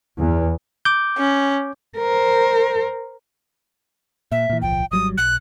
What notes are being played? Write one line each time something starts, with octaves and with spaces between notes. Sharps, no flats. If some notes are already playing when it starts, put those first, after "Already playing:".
E2
D6 G6
C#4
A#4 C5
A#2 E5
A#2 E3
D1 B1 F3 G5
G#1 F#3 G3 D#6
B1 F#6